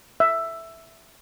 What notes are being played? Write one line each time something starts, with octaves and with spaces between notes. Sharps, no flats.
E5